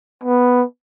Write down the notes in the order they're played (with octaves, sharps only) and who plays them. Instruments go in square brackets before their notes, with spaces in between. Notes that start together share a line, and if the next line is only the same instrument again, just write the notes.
[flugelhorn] B3